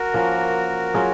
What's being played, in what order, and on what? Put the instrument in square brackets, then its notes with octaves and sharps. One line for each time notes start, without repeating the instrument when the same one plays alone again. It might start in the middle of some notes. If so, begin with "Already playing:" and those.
Already playing: [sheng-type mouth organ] F#4 A#4
[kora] F3 A#3 C#4
F#3 C#4 F4 G#4